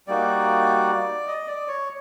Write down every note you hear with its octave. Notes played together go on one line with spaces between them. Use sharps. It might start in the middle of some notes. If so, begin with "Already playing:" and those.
G3 A#3 D#4 F#4 D5
D#5
D5
C#5